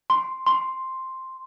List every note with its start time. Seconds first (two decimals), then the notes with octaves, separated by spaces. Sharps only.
0.10 C6
0.46 C6